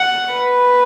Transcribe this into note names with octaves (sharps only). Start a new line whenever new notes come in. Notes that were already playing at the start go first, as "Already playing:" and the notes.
Already playing: F#5
B4